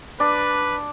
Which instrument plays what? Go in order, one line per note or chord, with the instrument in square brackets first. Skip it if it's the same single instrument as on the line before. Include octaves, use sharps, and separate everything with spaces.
[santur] D4 [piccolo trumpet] B4